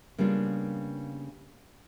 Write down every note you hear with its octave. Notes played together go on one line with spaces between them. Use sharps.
C#3 G3 A#3 B3 D4 F4